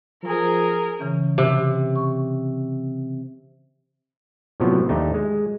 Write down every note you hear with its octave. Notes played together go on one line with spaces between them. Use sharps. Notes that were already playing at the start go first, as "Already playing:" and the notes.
F3 G#4 A#4
C#3 E3 C#4
C3
C#6
A2 C3 F3 F#3 B3
D#2 A3 D4 D#4 G4
G#3